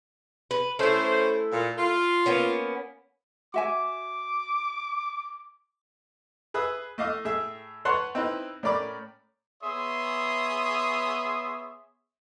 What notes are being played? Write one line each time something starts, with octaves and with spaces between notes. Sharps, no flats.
B4
A3 C#4 E4 C5
A#2
F4
A#3 B3 C#4
F#4 E5 G#5 D6
G#4 B4 E5 D#6
A3 D#5 F5 D6 D#6
A2 G#4 E5
B4 C#5 F#5 A5 C6 C#6
C4 D#4 E4 B4
A2 C#4 A#4 D5 B5 D6
B3 G#4 C#5 E5 C6 D#6